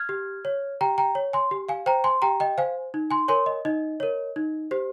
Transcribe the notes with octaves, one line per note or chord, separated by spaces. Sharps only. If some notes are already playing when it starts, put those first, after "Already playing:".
Already playing: F6 G#6
G4
C#5
G4 G5 A#5
G5 A#5
C#5
G#5 C6
G4
F5 G#5
C5 G5 A#5
G#5 C6
G4 G5 A#5
D#5 G5
C5 F5 G#5
D#4
G#5 C6
A#4 C#5 G#5 C6
D#5
D#4 D#5
A#4 C#5
D#4
G4 C5